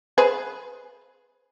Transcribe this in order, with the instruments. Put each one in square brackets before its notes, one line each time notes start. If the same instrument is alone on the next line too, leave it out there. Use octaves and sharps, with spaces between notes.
[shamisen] G#4 B4 C5